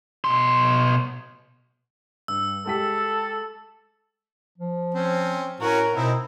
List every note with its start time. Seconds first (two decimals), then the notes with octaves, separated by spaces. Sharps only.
0.25 B2 C6
2.28 G2 E6
2.66 G#3 G4 A4 B6
4.58 F3
4.95 C4 C#4
5.61 A2 C#4 F#4 A#4
5.94 B2 C4 D#4 E4